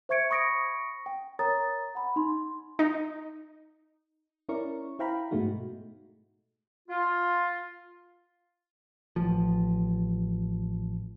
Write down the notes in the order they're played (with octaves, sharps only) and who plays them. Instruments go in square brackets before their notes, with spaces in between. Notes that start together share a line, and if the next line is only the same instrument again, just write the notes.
[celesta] C5 E5 C#6 G#6 C#7 D7
B5 C#6 D#6 A#6 C#7 D7
G5
A#4 C#5 A#5 D#6 A6
F#5 B5
D#4 C6
[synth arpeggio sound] D#4
[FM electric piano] C#4 E4 A#4 D5 C#6
E4 C5 F5 G5 A#5 B5
G#2 B2 G#3 A3 D#4 F#4
[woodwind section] F4
[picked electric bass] A1 F3